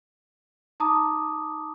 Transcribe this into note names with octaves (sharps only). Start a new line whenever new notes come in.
D#4 A5 A#5 D6 D#6